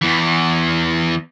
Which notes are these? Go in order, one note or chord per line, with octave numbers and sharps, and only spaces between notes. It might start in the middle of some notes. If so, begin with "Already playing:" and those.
E2 E3